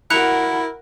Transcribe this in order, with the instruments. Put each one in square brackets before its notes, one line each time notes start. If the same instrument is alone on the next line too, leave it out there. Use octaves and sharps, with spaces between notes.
[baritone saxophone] E4 [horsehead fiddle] F#4 A#4 [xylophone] F#6 C#7 F7